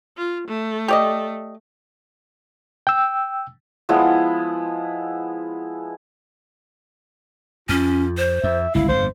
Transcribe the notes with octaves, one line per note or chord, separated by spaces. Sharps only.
F4
A3
G4 D5 D#5
G5 E6
F3 G#3 B3 E4
F2 C#4 F4
C5
F2 E5
G1 C#2 E4 F5
G1 F2 A#2 C5